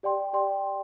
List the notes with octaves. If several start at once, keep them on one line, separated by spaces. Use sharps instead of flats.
G4 D5 G5 C6
G4 D5 G5 C6